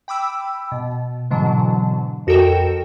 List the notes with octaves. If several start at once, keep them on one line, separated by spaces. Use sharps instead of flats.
G5 B5 D6 E6
B2
G#2 B2 D3 E3 F#3
F2 F#4 A4 A#4 G5 E7